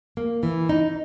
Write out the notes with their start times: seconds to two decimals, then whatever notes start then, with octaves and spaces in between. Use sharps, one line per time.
0.17 A#3
0.43 E3
0.69 D#4